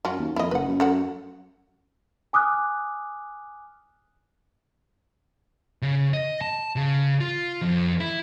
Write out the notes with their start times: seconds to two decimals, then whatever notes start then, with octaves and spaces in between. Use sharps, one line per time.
0.05 F#2 C#4 F4 F#4
0.19 D#2
0.36 F2 E4 D#5
0.51 F#1 B4 F#5
0.67 F#2
0.80 A3 F#4 F#5
2.33 G#5 D6 D#6 F6 F#6
5.82 C#3
6.13 D#5
6.41 A5
6.76 C#3
7.21 F4
7.62 F2
8.00 E4